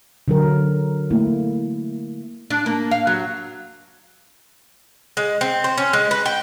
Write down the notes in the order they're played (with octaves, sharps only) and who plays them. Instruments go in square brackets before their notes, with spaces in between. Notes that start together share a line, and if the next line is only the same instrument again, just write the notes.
[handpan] D3 F#3 A#4
A3 A#3 E4
[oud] D4
A#3
F5
F#3
[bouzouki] G#3
C4
C5
C#4
G#3
B4
G5